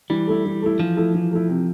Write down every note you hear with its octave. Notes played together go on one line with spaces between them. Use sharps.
E3 G3
A3 E4
E3
A3 E4
E3 F3
A3 E4
E3
A3 E4
C3